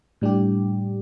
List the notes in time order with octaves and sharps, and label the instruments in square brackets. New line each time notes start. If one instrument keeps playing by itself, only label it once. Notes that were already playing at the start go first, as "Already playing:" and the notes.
[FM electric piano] A2 G3 D4 G4